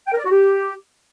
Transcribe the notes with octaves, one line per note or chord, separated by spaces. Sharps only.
G5
A#4
D5
F#4
G4